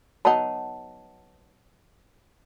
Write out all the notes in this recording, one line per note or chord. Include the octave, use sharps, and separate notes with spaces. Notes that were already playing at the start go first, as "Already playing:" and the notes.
F#3 B3 D#4 F#5 A5